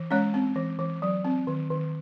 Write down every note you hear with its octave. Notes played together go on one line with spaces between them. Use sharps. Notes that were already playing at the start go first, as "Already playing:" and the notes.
Already playing: E3
G#3 C#4 C#5
C4
E3
E3
F#3
C4
D#3
D#3